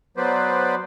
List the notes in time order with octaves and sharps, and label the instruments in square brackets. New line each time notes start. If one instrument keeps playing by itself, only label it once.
[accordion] F#3 B3 B4 C5 D5